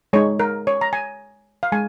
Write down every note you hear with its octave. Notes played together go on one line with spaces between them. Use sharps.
G#3 D#4 C#5
A#4
C#5
A#5
G#5
F5
G#3 G#5